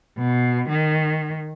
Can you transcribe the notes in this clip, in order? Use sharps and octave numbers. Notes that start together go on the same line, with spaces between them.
B2
D#3